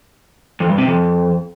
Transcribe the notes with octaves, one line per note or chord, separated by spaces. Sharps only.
F2
G2
C3
F2